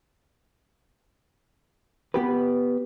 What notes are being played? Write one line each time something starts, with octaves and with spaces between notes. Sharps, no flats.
B3 G4 B4